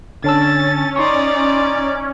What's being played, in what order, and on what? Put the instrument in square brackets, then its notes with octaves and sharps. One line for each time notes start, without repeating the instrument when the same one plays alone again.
[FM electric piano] D3 A5 E6 [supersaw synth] C#4 [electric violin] A6
[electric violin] D#4 D5 [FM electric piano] C6 C#6